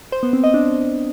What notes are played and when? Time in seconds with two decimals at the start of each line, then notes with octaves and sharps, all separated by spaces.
0.12 C5
0.23 B3
0.33 C4
0.44 D#5
0.54 D4